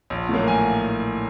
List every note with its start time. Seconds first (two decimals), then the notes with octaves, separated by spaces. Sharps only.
0.10 A#1
0.29 A2 F#3 A#3
0.48 G#5